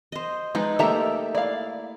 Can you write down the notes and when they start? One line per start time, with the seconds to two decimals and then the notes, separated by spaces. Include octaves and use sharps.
0.12 C5 D#5
0.55 F3 G#3 D#4 B4
0.79 A3 A#3 G4 A4 E5 A#5
1.35 E4 D5 F5